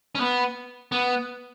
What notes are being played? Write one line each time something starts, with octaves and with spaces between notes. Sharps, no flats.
C#4
B3
B3